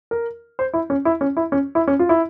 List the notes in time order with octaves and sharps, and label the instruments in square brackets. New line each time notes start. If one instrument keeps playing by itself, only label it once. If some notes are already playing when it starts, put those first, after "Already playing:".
[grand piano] A#4
C5
E4
C#4
E4
C#4
E4
C#4
E4
C#4
F4
E4